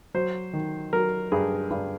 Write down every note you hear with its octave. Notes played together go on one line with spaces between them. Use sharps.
F#3 C5
D#3
F#3 A#4
G2 G#4
G2